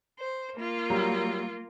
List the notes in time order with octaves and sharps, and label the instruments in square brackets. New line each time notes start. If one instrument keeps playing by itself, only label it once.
[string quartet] C5
A#3 F4
[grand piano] F#3 G3 A#4